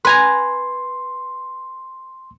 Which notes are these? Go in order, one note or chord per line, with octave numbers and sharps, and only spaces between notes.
B4 G#5 A#5 C6